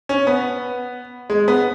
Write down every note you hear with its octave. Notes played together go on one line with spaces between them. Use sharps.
C#4
B3
G#3
B3